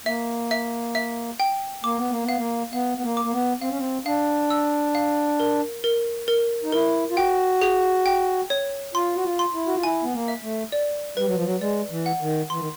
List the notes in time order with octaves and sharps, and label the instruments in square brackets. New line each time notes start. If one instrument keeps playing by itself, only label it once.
[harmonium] A#3 [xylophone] E5
[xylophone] E5
E5
G5
[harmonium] A#3 [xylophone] D6
[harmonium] B3
A#3
[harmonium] B3 [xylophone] F5
[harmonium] A#3
[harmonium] B3 [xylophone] F5
[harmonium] B3
A#3
[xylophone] D6
[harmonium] A#3
B3
[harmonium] C4 [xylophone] F5
[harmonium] C#4
C4
[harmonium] D4 [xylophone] F5
[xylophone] E6
F5
A#4
A#4
A#4
[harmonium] D#4
[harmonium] E4 [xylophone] A#4
[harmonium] F4
[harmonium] F#4 [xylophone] G5
[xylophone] G#4
G5
C#5
[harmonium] F4 [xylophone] C6
[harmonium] F#4
F4
[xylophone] C6
[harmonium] E4
F#4
F4
[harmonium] E4 [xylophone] G#5
[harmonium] B3
A#3
[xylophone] E5
[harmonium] A3
[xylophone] D5
[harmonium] G3 [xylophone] B4
[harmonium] F#3
F3
F#3
[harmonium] G#3 [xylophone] D5
[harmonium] E3
[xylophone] F#5
[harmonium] D#3
[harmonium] E3 [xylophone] C6
[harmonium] D#3